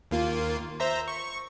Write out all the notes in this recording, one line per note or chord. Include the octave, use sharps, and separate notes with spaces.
D#2 A#3 F4
C5 E5 A#5
C#6